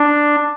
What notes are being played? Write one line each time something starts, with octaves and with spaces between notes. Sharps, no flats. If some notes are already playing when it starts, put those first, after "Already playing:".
Already playing: D4